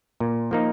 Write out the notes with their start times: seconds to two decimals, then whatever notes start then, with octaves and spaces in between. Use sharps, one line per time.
0.20 A#2
0.51 F3 A#3 D#4